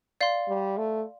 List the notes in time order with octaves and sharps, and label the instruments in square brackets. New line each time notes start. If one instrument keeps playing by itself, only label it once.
[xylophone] D5 F5 C6
[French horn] G3
A3